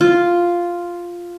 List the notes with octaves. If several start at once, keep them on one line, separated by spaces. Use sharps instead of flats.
F4